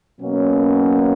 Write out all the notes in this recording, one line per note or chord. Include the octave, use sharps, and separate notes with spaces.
B2 F#3 A#3 C#4